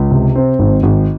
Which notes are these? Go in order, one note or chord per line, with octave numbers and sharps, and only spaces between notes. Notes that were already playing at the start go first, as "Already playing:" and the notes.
Already playing: C#2
C3
C4
G#1
G#1